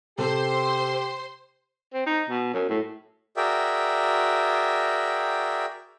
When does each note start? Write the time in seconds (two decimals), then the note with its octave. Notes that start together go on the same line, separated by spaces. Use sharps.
0.18 C3 G4 A4 C5 C6
1.94 C4
2.06 D#4
2.30 B2
2.54 F#2
2.69 A2
3.37 F#4 G#4 A#4 D5 E5 G5